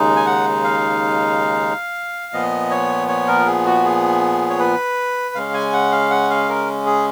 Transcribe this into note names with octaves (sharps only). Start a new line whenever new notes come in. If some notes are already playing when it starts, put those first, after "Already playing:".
Already playing: D#2 C#3 G#3 D#4
G#5
F#5
F5
A#2 F3 B3 D#5
C#5
C#5
A#4
G#4
F#4
G#4
C#5
B4
C#3 G#3 C#4 F5
G#5
F#5
F5
F#5
F5
A#4
G#4